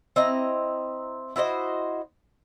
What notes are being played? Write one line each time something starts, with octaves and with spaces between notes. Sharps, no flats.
C4 E4 D#5 A#5
E4 F#4 C5 D#5